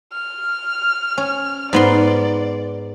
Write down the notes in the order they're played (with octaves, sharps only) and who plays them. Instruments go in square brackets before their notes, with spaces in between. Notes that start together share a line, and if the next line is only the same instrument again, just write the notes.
[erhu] F6
[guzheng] C#4
[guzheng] G#2 B3 C6 [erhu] D5